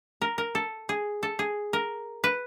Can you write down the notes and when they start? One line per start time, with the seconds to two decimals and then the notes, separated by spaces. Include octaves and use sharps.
0.22 A#4
0.38 A#4
0.55 A4
0.89 G#4
1.23 A4
1.39 G#4
1.73 A#4
2.24 B4